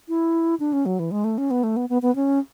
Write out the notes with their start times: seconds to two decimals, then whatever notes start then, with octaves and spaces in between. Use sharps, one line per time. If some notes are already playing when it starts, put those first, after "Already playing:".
0.08 E4
0.60 D4
0.73 C#4
0.86 F#3
0.99 E3
1.11 G#3
1.24 A3
1.38 C#4
1.51 B3
1.64 A3
1.77 B3
1.89 B3
2.02 B3
2.16 C#4